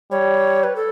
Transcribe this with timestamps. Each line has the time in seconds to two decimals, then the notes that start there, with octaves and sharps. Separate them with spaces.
0.11 G3 C#5
0.64 B4
0.76 A4